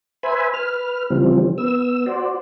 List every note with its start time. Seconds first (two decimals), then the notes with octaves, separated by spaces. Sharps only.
0.23 B4 C5 E5 G#5 B5
0.54 B4 F6
1.10 C#3 E3 F3 G3 C4
1.58 B3 E6
2.06 F#4 C5 D5